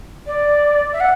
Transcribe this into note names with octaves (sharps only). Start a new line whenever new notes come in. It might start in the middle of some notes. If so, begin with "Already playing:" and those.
D5
E5
F#5